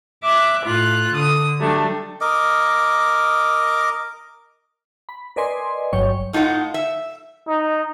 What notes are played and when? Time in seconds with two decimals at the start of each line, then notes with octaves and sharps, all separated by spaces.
0.24 E5 D6 F#6
0.66 A2 F4 F#6
1.13 D3 D#6
1.59 F#3 G3 A3 D4
2.21 A#4 D#5 D6
5.09 B5
5.36 A#4 B4 D5 D#5 G#5 C6
5.93 G1 G2 F#3 C#5 G5 C#6
6.33 A2 D#4 F4 B4 F#5
6.74 E5
7.48 D#4